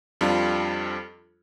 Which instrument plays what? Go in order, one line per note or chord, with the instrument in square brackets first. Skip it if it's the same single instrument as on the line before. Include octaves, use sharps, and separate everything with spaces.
[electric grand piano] F2 G3 D4 F4